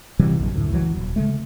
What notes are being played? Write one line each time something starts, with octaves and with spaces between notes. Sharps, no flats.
C3 E3 F#3 G3
A#1 F#2 D#3
D2 A2
C#2 E3 F#3
D#1
C#3 G#3 A3